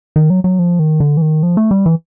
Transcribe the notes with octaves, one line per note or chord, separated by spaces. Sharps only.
D#3
F#3
F#3
F3
D#3
D3
E3
D#3
F3
A3
G3
E3